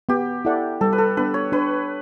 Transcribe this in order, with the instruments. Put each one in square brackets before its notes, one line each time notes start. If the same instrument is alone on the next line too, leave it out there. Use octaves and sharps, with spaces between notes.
[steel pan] B3 [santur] G4
[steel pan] E4 A4 D5 F#5
[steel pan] G3 [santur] A4
[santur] B4
A4
[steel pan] B3 D4 [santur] B4
[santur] C#5
[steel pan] D4 [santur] B4